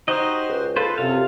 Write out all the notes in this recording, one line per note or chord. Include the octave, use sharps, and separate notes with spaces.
D#4 F#4 G4 C5 D#5
C#2
F4 A4 B4 C5
F#2 C3 F4 F5